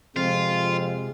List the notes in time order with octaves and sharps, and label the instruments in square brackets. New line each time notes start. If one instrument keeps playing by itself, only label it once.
[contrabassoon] F2 [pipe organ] C3 G#3 [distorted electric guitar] F4